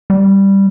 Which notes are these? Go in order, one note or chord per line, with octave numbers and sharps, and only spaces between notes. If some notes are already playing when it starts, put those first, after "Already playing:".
G3